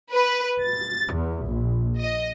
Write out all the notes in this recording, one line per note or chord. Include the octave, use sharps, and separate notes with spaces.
B4
A6
E2
A#1
D#5